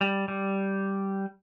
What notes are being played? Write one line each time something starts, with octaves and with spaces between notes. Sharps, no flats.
G3
G3